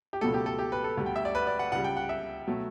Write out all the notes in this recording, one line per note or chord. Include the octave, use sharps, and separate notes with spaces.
G4
C#2 B2 F#3 A3 A4
G4
A4
G4
B4
A4
D2 D3 G3
G5
E5
D5
B4
D5
F#5
C#2 C#3 G3 F#5
G5
F#5
E5
B2 F#3 A3